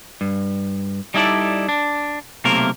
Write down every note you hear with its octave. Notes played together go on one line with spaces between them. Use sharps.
G2
G3 D#4 E4 A4 D5
D4
B1 C3 A3 A#3 A#4